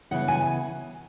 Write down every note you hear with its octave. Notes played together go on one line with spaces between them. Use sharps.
C#3 E3 B3 E4 F#5
G#5